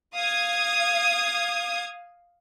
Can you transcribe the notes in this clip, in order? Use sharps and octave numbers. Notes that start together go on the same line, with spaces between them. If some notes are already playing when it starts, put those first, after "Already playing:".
F5 D#6 G#6